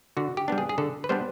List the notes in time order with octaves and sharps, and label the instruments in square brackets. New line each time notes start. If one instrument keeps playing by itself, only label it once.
[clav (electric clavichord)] D3 F#4
G4
G3 B3 D4
G#4
G#4
D3 A4
B4
G3 B3 D4 C5